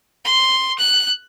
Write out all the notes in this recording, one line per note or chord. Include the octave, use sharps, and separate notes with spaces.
C6
F#6